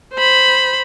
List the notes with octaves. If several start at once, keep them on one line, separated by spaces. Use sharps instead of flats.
C5 B5